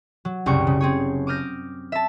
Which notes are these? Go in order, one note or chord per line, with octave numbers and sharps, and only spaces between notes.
F#3
F#1 C2 C#3 G5 C#6
C#3
C4 G#4 C#5
D6 D#6 F6 G6 A#6
E5 A5